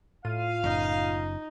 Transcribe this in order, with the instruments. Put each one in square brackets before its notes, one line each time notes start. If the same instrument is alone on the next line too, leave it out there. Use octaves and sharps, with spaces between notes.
[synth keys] A2 F4 D#7 [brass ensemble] F5
[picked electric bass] F#1 [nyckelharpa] D#4